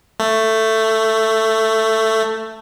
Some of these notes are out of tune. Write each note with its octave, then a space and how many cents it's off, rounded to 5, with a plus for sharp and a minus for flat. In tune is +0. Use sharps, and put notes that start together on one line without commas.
A3 +10